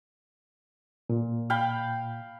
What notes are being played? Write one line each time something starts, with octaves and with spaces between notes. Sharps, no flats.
A#2
F5 G5 B5